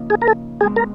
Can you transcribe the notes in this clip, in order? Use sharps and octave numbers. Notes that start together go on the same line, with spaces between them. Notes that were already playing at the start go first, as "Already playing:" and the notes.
Already playing: C#3 F3 A#3 D#4
G#4
A#4
A4
B2 G#3 C4 G#4
A#4